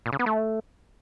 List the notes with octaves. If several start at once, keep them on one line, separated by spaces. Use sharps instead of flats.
A#2
C#3
B3
A3